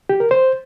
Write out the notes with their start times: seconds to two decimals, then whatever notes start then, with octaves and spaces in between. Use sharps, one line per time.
0.09 G4
0.20 A#4
0.31 C5